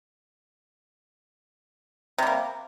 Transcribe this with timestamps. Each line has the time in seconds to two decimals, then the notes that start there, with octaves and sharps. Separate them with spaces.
2.18 C3
2.23 G3
2.27 A#3